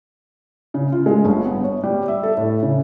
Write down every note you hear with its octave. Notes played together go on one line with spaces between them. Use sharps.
C#3
F4
G#3
G1
B3
C#5
G3
E5
A4
A2
C#3